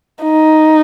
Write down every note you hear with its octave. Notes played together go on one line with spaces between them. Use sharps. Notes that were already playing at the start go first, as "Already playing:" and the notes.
D#4